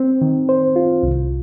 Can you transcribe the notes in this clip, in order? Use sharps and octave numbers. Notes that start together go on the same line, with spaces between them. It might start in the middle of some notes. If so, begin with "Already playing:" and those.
Already playing: C4
D#3
C5
F4
C2